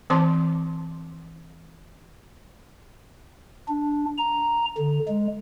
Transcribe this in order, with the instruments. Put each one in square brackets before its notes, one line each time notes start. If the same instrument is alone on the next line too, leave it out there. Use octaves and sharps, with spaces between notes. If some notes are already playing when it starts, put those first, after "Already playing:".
[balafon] E3 C4 C5 A5 C6 D6
[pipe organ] D4
A#5
D3
G#3